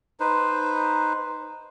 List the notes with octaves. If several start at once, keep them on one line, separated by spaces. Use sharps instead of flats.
D#4 B4 C5